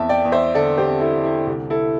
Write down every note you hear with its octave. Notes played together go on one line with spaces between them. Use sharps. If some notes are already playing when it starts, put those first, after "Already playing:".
Already playing: E2 C4 E5 A5
D5 G5
E2
C5 E5
D3 A4 D5
G4 C5
C4
E4 A4
D3
E4
C2 G4
E4 A4